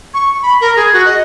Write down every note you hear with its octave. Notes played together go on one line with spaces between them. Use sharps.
C#6
B5
A#4
G#4
F#4
D#5